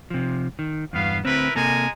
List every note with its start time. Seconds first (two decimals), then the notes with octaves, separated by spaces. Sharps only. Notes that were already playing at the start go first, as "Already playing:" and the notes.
0.10 C3 F3
0.59 D#3
0.93 E2 G2 B3 F5
1.25 D2 C4 E4 A#4 B4
1.56 C3 G#3 A#3 A4 G#5 A#5